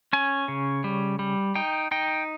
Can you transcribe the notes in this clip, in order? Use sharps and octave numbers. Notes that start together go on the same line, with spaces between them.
C#4 G#5
C#3
G3
G3
D#4 G5
D#4 G5